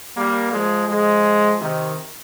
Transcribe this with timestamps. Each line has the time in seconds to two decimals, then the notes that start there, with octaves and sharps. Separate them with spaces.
0.16 G3 A#3
0.52 F3 G#3
0.88 F3 G#3
1.61 C3 D#3